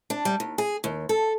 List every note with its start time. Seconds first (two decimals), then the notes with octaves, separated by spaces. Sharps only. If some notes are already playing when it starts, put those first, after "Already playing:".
0.10 D4
0.25 G3
0.40 D#2
0.58 G#4
0.84 D#2
1.09 A4